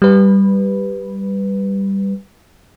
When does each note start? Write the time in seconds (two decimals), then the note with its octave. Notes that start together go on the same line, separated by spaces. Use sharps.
0.02 G3 B4